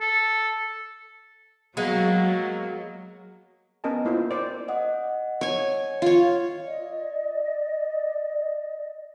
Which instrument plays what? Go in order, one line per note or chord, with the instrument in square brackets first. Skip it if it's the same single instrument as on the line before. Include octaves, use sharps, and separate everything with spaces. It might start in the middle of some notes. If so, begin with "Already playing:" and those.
[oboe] A4
[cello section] F#3 [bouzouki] G#3 A#3 B3
[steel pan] B3 C#4 A#4 D#5 G#5 A5
A#3 E4 F4 C5
C5 D5
[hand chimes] D#5 F#5 D#6
[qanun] C#5 G#5
F4 C#5
[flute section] D5 D#5